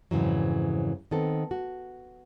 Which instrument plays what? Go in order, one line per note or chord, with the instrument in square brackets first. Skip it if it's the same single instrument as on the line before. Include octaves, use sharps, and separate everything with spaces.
[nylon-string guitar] F2 G#2 C#3 E3 F#3
D#3 B3 C4 A4
F#4